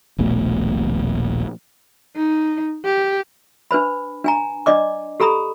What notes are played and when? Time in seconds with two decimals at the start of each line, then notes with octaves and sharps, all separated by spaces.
0.19 D#1 A#1 B2 A3
2.16 D#4
2.84 G4
3.71 D4 B4 C5 B5
4.24 D4 G#5 A#5
4.66 D4 D5 D#5 D6
5.20 G4 A4 A#5 B5 D#6